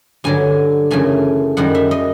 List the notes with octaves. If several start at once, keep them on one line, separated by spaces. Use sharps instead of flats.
G2 D3 F#3 G#5
F#2 C#3 E3 A3 G#5
F#2 D#3 G3 F#5
E5
D#5